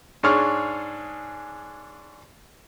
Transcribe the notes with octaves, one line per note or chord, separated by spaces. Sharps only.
G#2 D4 G#4 C#5 F6